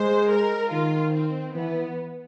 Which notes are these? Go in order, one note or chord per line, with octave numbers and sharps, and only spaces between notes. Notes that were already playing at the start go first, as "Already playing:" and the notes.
Already playing: G#3 C5
A#4
D#3 F4
C4
E3 B3